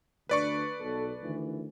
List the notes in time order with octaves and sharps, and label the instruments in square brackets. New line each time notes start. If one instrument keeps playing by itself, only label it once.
[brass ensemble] D2 D4 [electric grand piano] B4 D5 C#6
[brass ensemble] B1 A4
D2 D#3 E3